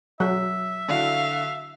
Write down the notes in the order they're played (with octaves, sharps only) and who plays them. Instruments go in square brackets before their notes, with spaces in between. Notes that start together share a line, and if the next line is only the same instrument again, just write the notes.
[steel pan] F#3 [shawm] E5
[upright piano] D3 E4 F#4 [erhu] F5